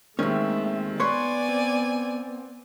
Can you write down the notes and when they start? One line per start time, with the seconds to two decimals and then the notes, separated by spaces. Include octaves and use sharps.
0.19 D#2 D#3 G#3 A3 C4 C#4 E5
1.00 B3 B4 C#5 D5 G#5 C6 F#6
1.49 C4